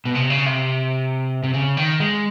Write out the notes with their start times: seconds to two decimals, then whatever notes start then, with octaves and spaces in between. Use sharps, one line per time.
0.05 B2
0.15 C3
0.30 C#3
0.46 C3
1.43 C3
1.54 C#3
1.77 D#3
2.00 G#3